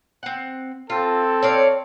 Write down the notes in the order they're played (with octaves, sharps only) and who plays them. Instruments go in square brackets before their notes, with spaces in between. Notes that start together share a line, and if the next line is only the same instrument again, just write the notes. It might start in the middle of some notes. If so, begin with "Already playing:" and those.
[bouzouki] C4 F#5
[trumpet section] C4 A4 [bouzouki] F4
[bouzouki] C#5 D5 F5